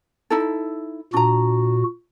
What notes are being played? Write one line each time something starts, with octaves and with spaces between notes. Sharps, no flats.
D#4 E4 A4
A#2 D4 F#4 A#5